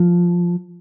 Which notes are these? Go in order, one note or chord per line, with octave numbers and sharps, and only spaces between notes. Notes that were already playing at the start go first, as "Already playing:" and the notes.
Already playing: F3